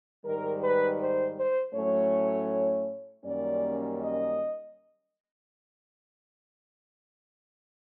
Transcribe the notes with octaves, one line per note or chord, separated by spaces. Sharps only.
G#2 D#3 G3 A#4
B4
C5
C5
A2 F#3 A3 C#4 C#5
F#2 D#3 G3 A#3 C#4 D5
D#5